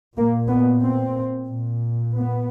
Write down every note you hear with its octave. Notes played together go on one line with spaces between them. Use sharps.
A#2 A#3
B3
C4
A#2
B3